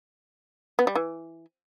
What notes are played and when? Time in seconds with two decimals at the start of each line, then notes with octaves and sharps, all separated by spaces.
0.79 B3
0.87 G3
0.96 E3